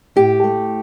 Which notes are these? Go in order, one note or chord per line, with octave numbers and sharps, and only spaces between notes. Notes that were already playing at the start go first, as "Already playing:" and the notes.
A2 G4
A3